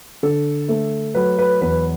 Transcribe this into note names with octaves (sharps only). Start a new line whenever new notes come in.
D3 A4
A3
F#3 B4
B4
E2 B4